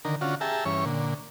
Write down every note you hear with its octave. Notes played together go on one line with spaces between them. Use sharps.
D3 D#3 A#4
D3 C#4 F4 F#4
G4 G#4 E5 A5 A#5
G2 E3 C#4 C#5
A#2 D3